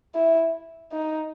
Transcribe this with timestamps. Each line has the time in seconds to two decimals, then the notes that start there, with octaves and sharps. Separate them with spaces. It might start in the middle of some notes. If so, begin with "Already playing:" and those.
0.14 E4
0.92 D#4